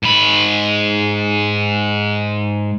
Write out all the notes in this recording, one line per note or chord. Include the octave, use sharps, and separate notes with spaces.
G#2 B5